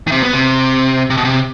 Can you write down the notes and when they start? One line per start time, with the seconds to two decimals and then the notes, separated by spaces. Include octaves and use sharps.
0.07 D#3
0.12 C3
0.23 B3
0.33 C3
1.10 C3
1.17 B2
1.25 C3